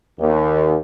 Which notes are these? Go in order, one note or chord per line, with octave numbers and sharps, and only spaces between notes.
D#2